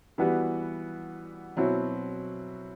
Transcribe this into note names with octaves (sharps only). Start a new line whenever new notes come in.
E3 G3 B3 F#4
B2 F#3 C4 E4